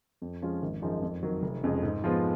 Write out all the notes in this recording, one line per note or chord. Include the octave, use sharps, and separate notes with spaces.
F2
F3 G#3 C#4 F4
G#1
F#2 F3 G#3 D#4
F2
D#3 F#3
F1
F2 C#3 G#3
G#2
F3 G#3 B3 F4